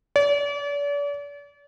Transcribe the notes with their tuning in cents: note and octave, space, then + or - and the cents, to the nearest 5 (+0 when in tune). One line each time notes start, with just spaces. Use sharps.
D5 -40